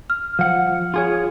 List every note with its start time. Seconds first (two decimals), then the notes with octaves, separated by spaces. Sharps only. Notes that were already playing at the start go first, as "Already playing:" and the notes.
0.10 F6
0.39 F3 F#5
0.94 F4 G#4 C#5